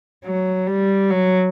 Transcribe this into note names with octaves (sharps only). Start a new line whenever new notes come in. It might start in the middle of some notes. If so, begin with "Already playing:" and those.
F#3
G3
F#3